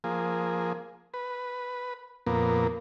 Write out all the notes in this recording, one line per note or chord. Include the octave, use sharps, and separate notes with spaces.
F3 A#3 G#4
B4
F2 A#2 A#3 B3